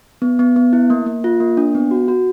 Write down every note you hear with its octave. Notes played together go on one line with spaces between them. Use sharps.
B3
B3
B3
E4
A#3
A#3
F4
A#3
D4
B3
F#4
F#4